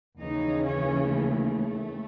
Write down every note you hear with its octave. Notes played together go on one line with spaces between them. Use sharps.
D#2 C#3 E3 D#4
C#4
A3